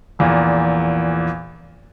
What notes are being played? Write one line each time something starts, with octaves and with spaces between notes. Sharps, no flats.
A#1 E2 A#2